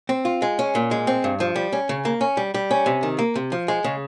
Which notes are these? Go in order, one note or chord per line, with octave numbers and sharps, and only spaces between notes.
C4
F4
G#3
C#4
A#2
G#3
C4
G2
F3
G3
C#4
C#3
A#3
C#4
G3
G3
C#4
C3
D#3
A#3
C3
F3
G#3
C#3